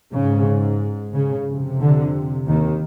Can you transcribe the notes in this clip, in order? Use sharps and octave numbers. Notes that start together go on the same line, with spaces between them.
G#2 C#3
C#3
F2 C3
D3
D#2 D#3